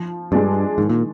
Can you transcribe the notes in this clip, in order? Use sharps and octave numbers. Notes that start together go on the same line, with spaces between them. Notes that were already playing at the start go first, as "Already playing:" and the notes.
Already playing: F3
G2 G#3 D4
G#2 D#3
A#2